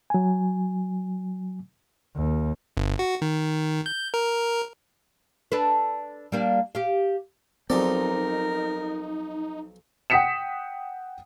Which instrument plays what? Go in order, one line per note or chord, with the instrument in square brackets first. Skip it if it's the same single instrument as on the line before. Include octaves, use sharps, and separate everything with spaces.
[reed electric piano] F#3 G#5
[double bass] D#2
[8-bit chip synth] G1
F#4
D#3
G6
A#4
[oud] D4 A4 B4
G3 A#3 D4
G4 F5
[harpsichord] B1 F3 D5 [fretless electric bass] C4 [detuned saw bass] D#4 [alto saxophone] A#4
[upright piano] F#5 G5 D#6 B6 C#7 E7